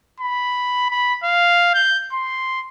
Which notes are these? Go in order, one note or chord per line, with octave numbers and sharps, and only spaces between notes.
B5
B5
F5
G6
C6